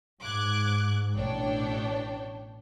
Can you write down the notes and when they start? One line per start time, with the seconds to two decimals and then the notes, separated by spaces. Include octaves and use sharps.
0.22 G#2 D6 F#6 G#6
1.16 A1 B2 D4 C#5 G5